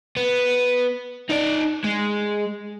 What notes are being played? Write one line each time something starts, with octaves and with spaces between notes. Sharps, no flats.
B3
D#4 D5
G#3